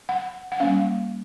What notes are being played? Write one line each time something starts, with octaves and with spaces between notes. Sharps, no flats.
F#5
F#5
G3 A#3 C#4 F5